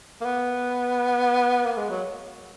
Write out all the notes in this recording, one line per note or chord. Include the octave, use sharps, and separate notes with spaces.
A#3
B3
A#3
G#3
F#3